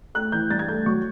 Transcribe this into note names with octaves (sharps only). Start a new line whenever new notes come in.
A3 F#6
E3 G6
G2 A6
G#6
A3 G6
F#3 C#6